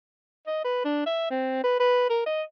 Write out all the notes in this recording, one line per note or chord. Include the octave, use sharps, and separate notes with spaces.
D#5
B4
D4
E5
C4
B4
B4
A#4
D#5